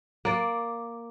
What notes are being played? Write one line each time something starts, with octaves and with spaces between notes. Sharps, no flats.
A#3 D5